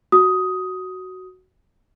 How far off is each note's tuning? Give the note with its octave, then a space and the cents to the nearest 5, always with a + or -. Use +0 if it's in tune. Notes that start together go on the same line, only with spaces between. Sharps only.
F#4 +5 D#6 +10